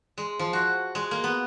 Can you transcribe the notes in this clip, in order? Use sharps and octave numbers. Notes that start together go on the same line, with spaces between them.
G#3
F3
F#4
G#3
A#3
B3